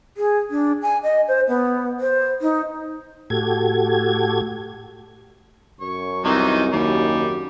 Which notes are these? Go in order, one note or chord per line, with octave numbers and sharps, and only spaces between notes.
G#4
D4
G#5
D#5
C5
B3
C5
D#4
A2 F#4 G4 A4 G#6
F#2 C#5
C2 D#3 E3 D#4
D#2 G3